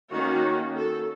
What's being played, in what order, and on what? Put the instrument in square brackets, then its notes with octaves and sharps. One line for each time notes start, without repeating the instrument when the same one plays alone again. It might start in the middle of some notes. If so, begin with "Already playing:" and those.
[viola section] D#3 A#3 C#4 F#4
A4